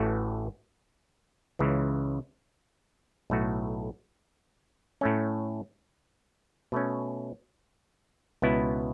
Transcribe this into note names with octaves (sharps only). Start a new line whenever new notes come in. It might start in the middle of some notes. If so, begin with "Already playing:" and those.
Already playing: A1 A2 E3 A3 F#4
C#2 C#3 E3
B1 A2 A3 F#4
A2 A3 C#4
B2 A3 C#4
C#2 B2 B3 E4